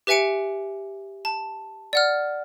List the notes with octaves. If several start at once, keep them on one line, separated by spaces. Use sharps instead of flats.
G4 B4 E5 G#5 C#7 D7
A5
D5 F#5 F6